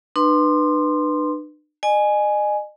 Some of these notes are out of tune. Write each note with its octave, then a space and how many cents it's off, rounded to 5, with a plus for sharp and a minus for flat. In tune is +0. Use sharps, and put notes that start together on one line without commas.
D4 +45 B4 +0 C6 +0
D#5 -40 G#5 +5